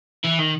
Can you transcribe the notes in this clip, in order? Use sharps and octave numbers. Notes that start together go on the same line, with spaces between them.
E3
D#3